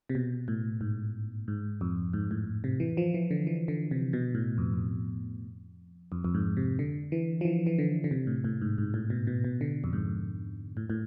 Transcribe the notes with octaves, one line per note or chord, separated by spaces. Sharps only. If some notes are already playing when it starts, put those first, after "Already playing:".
C3
B2
A2
G#2
G#2
F2
G#2
A2
C3
E3
F3
E3
D3
E3
D3
C3
B2
A2
F2
F2
F2
F2
G#2
C3
D3
E3
F3
E3
E3
D3
D3
C3
A2
A2
G#2
G#2
A2
B2
B2
B2
D3
F2
G#2
A2
A2